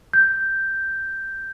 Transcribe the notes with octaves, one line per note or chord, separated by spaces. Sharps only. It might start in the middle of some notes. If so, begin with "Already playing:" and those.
G6